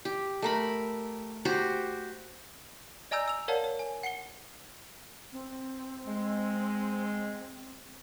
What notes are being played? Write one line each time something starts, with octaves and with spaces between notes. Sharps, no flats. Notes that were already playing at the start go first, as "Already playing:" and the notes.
G4
A3 A#4 B5
F#4 G4 C5
D5 D#5 G#5 A#5 E6 G6
E6 F7
A#4 C#5 D5 F5 F#5 A5
C#5
G#5
F#5 C7 C#7 G7
C4
G#3